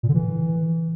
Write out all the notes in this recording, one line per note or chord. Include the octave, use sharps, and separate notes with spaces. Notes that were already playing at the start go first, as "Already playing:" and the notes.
A#2
D3
E3